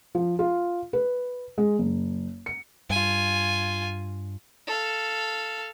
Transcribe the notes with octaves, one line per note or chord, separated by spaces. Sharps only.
F3
F4
B4
G#3
F#1
C#7
G2 F4 G#5
A4 F5